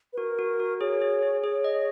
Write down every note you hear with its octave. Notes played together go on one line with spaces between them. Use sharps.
B4
F#4 A#4
F#4
F#4
G#4 C#5
G#4
G#4
G#4 C#5
D#5